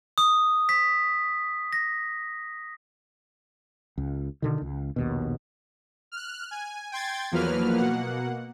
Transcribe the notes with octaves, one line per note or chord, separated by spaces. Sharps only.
D#6
B6
A#6
C#2
B2 D3 D#3
C#2
A#1 D#2 B2
F6 F#6
G#5
G5 C6 G#6 A6
E2 F3 F#3 A#3 B4 F6
B2 A#3 F#5